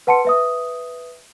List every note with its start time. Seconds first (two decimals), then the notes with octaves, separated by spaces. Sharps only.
0.07 B4 F#5 A5 C6 C#7
0.25 B4 E5 D#6